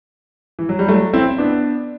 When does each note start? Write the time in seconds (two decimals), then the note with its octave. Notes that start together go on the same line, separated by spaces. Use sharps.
0.59 E3
0.69 F#3
0.79 G3
0.88 F#3 A3
1.13 C4 E4
1.38 B3 D4